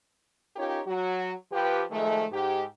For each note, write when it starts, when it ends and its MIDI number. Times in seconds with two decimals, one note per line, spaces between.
0.56 0.79 61
0.56 0.79 63
0.56 0.79 65
0.56 0.79 67
0.56 0.79 70
0.56 0.79 73
0.86 1.32 54
0.86 1.32 66
1.52 1.82 53
1.52 1.82 67
1.52 1.82 71
1.90 2.24 51
1.90 2.24 53
1.90 2.24 56
1.90 2.24 57
2.31 2.63 44
2.31 2.63 67